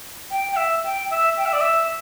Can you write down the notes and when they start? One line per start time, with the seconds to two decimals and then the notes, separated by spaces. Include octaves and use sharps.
0.30 G5
0.53 G5
0.56 E5
0.84 G5
1.11 E5
1.37 G5
1.46 E5
1.53 D5
1.61 E5